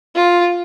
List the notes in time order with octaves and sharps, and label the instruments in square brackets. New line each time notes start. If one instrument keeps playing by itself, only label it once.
[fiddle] F4